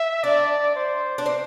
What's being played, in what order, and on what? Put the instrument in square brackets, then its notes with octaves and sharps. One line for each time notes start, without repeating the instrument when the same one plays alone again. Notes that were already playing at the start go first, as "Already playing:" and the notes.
Already playing: [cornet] E5
[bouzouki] D4 [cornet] D5
[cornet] C5
[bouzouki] D4
C4